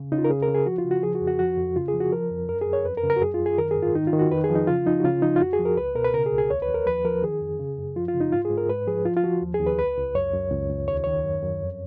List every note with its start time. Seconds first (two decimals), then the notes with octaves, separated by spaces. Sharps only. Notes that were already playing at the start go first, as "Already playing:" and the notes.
Already playing: C#3
0.12 C#3 D#4
0.18 F4
0.25 A#4
0.30 C#3 G#4
0.43 A#4
0.48 C#3
0.54 G#4
0.66 F3 F#4
0.78 F4
0.85 C#3
0.91 F#4
1.03 F3 G#4
1.15 F#4
1.21 F2
1.28 F#4
1.39 F3 F#4
1.58 F2
1.76 C#3 F4
1.88 G#4
1.94 F3
2.01 F#4
2.12 F3 A#4
2.30 F2
2.49 F#2 A#4
2.61 G#4
2.67 F#2
2.73 C#5
2.85 F2 B4
2.98 A#4
3.03 C#3
3.10 A#4
3.16 F#4
3.22 F#2 G#4
3.34 F4
3.40 F#2
3.46 G#4
3.58 D#3 A#4
3.71 G#4
3.77 G#2
3.83 F4
3.95 D#3 D#4
4.07 F4
4.13 D#3
4.19 F#4
4.31 F2 B4
4.44 G#4
4.50 F3
4.56 D#4
4.67 C#3 F4
4.86 F3 D#4
5.00 F#4
5.04 C#3 F4
5.22 F3 D#4
5.36 F4
5.41 F2 F#4
5.53 G#4
5.59 F3
5.65 A#4
5.77 C#2 B4
5.95 B2 A#4
6.05 B4
6.14 C#3 A#4
6.26 G#4
6.32 C#2
6.38 G#4
6.50 D#2 C#5
6.62 B4
6.68 D#2
6.74 A#4
6.86 F3 B4
7.04 F3 A#4
7.23 D#3 G#4
7.42 F2
7.60 C#3
7.78 F#2
7.96 F3 F4
8.08 F4
8.14 C#3
8.21 D#4
8.32 G#2 F4
8.45 G#4
8.50 G#2
8.57 A#4
8.69 G#2 B4
8.87 F3 G#4
9.05 F3 F4
9.17 F4
9.24 F3 F#4
9.42 D#2
9.54 G#4
9.60 D#2
9.67 B4
9.79 C#2 B4
9.97 C#2
10.15 F#2 C#5
10.34 F#2
10.51 C#2
10.70 C#2
10.88 D#2 C#5
11.04 D#3 C#5
11.24 F#2
11.43 F#2
11.61 F2